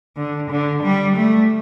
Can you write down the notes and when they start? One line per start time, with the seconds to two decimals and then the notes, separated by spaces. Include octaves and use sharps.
0.17 D3
0.50 D3
0.83 G3
1.16 A3